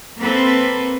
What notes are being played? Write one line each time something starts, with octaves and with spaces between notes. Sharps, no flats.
A#3 C4 A4 B4